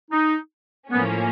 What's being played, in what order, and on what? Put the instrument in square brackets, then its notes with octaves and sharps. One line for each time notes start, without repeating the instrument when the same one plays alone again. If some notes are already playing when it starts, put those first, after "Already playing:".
[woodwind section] D#4
[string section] A2 F3 A#3 C#4 [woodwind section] B3